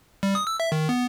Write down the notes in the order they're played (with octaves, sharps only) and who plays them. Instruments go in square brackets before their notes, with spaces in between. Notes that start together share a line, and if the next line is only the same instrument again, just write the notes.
[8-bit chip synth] G3
D#6
E6
E5
D#3
B3